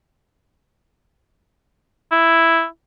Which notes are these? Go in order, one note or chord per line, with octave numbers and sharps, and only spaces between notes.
E4